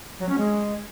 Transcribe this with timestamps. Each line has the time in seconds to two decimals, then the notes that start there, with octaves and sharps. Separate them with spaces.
0.19 F#3
0.29 C#4
0.38 G#3